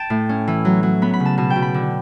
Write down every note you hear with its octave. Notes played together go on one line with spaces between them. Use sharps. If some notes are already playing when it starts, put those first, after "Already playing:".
Already playing: G5 A5
A2
C#4
E3
F#3
F#3
B3 B5
B5
C#3
A5
B2 A5
G5
B2
B5
D3